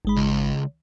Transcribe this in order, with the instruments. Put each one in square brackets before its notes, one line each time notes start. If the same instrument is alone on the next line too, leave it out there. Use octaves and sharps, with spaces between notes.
[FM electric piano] G#1 G#3 B5
[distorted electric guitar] C#2